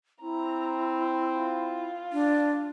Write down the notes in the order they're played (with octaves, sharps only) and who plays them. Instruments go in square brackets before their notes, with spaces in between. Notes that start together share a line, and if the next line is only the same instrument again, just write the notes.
[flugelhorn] C4 [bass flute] E4 [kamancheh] A#5
[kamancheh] F4
[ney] D4